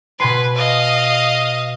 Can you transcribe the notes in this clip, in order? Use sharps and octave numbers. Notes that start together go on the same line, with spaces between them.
B2 B4 G#5 C6
D#5 F5